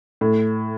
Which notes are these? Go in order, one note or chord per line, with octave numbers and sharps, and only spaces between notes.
A2